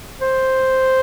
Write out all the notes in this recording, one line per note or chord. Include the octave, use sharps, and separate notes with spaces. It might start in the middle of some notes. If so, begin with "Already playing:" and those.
C5